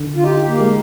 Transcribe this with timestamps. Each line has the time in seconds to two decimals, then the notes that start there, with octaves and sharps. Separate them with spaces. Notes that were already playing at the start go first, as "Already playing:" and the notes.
Already playing: D3
0.16 F4
0.24 D#4 G4
0.48 A#3
0.60 G#3